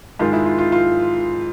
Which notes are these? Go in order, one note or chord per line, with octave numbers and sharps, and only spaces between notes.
G#2 D#3 G#3 F4
E4
F4
F4
F4